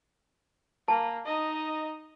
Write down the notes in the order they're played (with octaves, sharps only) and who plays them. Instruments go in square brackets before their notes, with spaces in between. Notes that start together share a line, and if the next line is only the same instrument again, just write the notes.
[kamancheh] A#3 [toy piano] A5
[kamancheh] D#4 D#5